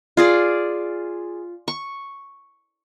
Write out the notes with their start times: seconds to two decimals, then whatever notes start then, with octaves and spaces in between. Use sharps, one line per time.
0.17 F4 G#4 D5
1.68 C#6